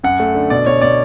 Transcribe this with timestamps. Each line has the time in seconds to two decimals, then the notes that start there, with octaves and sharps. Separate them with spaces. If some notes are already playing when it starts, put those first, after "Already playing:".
0.03 F#2 F#5
0.20 A3
0.35 D3
0.50 B2 D5
0.66 B2 C#5
0.82 B2 D5